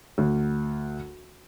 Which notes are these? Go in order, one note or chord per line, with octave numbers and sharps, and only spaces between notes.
D2